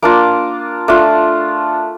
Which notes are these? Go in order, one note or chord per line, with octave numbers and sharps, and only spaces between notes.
A#3 D4 F4 D6
A3 D4 F4